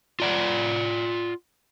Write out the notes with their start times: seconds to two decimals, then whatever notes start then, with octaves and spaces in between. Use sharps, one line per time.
0.20 F4 D5 F#5